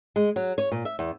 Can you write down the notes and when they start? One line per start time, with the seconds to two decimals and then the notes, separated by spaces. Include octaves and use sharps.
0.16 G#3
0.36 F#3
0.58 C#5
0.72 A#2
0.85 E5
0.99 E2